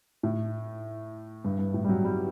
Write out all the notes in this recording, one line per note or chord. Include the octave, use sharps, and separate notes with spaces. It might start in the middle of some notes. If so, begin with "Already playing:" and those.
A2
G2
G2
A2
G3
F#3
G3